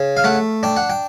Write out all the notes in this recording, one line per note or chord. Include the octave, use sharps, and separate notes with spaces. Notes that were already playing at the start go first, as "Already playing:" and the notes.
Already playing: C#3
F5
A3 F#5
D4 G5
F#5
G5